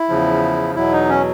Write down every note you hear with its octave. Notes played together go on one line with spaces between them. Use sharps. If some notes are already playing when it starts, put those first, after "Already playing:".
Already playing: E4
E2 C#3 F3
E2 B2 F#3 E4
D#4
C#4